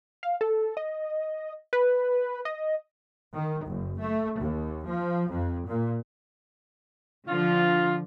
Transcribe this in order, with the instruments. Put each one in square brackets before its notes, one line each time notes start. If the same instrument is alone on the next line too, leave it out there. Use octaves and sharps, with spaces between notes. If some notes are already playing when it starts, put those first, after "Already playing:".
[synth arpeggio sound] F5
A4
D#5
B4
D#5
[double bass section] D#3
F#1
A3
D#2
F3
F2
A#2
[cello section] D3 F3 [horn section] F4